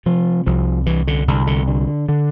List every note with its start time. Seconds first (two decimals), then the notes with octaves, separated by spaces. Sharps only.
0.06 C3 F3
0.46 C2 F3
0.86 C2 E3
1.08 D3
1.28 C2 D3
1.47 D3
1.67 D3
2.09 D3